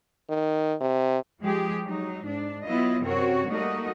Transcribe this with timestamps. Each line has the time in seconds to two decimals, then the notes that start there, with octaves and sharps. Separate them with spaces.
0.29 D#3
0.81 C3
1.42 F3 G#3 G4 G#4
1.83 F#3 D#4
2.24 G#2 D4
2.64 F#3 B3 E4 F4 D#5
3.02 F#2 C3 C4 F#4 A#4 C#5
3.47 G3 A3 A#3 D#4 F#4 D#5